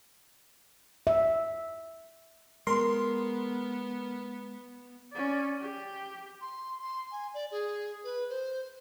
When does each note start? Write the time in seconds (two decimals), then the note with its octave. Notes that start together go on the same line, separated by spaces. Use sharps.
1.07 E5
2.67 G#3 B3 A#4 C6
5.13 C#4 D5
5.60 G4
6.41 C6
6.82 C6
7.12 G#5
7.34 D5
7.51 G#4
8.04 B4
8.29 C5